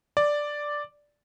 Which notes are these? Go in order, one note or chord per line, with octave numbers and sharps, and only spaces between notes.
D5